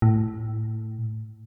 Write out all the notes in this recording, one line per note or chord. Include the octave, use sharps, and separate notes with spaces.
A2